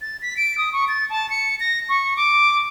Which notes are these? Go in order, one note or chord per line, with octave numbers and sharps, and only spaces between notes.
A6
B6
D7
D#6
C#6
A6
A5
C#7
A#6
C#6
D6